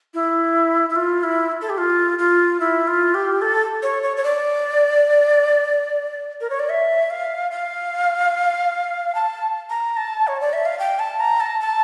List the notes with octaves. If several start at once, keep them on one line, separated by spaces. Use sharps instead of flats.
E4
E4
F4
E4
A4
G4
F4
F4
E4
F4
G4
A4
C#5
C#5
C#5
D5
A#4
C#5
D5
E5
F5
F5
A5
A#5
A5
C#5
D5
E5
F5
G5
A5
A#5
A5
A5